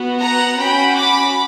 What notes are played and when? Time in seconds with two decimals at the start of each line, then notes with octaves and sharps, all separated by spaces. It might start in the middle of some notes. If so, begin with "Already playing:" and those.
Already playing: B3 F#4
0.21 F#5 A#5
0.58 C#4 F#4 G5 B5
0.96 B5 D6